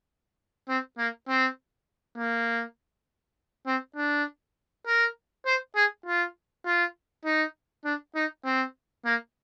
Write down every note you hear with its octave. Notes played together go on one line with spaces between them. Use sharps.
C4
A#3
C4
A#3
C4
D4
A#4
C5
G#4
F4
F4
D#4
D4
D#4
C4
A#3